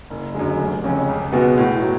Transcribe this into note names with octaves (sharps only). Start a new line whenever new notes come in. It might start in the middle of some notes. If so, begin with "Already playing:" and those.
F#1
F#2 D3 G#3
F1
F2 C#3 G#3 C#4
C#2
B2 G#3 B3 F#4
A2
F#3